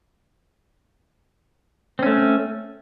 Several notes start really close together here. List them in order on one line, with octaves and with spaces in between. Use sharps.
C4 C#4 A3